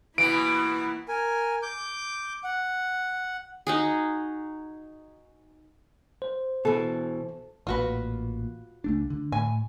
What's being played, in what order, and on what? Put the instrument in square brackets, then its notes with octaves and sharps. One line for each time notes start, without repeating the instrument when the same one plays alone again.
[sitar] B2 E3 [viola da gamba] A#3 E4 [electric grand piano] D7
[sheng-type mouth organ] A#4 G#5
D6 G6
F#5
[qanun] D#4 F#4 G#4
[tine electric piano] C5
[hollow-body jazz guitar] B2 E3 [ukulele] A4
[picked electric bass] A1 A#2 [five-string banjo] F4 F#4 B4
[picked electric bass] C#2 A3 D4
D3
[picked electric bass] A2 [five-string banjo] G#5